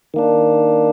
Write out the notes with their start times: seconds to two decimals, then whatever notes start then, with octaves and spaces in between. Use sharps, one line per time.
0.14 D#3 A#3 D4